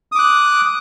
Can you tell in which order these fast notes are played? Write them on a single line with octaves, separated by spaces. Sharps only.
D#6 D6 F#6